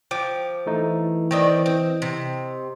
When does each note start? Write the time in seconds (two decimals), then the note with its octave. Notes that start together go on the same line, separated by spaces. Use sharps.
0.11 F3 G5 D6
0.67 E3 A3 D#4
1.31 D#3 C4 D5 D#5 G5
1.66 C4
2.02 C3